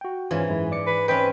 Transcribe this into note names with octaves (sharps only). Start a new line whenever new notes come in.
F#4 G5
G#2 E3 C#4 F4
F#2 G#3 E4
D5 D6 C#7
B4
C4 C#4 B4 C5 D#5 G5